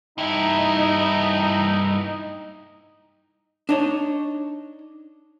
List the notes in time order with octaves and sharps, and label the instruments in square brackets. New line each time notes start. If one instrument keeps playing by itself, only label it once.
[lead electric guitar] G2 E4 [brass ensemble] D#4
[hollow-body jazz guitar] D4 D#4 C#5